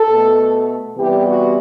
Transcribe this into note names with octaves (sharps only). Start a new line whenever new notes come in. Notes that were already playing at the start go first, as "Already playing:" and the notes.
Already playing: A4
B2 A3
C3 E3 G3 B3 G4
F#4